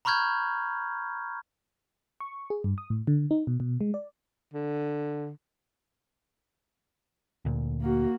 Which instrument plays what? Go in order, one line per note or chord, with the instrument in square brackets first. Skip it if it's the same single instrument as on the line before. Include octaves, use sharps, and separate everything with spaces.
[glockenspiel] A#5 B5 C#6 F6 G6 G#6
[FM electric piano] C#6
G#4
G2
D#6
A2
D3
D#4
B2
B2
G#3
D5
[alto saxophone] D3
[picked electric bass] D2 A#2
[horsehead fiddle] A#3 F#4